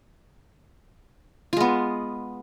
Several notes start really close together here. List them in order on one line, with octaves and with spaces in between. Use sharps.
F4 G#3 B3